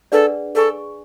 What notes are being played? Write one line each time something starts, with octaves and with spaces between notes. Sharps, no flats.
D4 G#4 A4 B4 D5 F#5
G#4 A4 D5 G#5 C#6